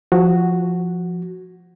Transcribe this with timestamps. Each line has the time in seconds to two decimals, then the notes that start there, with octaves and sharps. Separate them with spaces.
0.12 F3 F#4